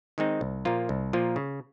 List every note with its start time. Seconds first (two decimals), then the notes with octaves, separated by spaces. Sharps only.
0.18 D#3 G#3 C4 D#4
0.41 C2
0.65 A#2 F3 A#3 F4
0.89 C2
1.13 A#2 F3 A#3 F4
1.36 C#3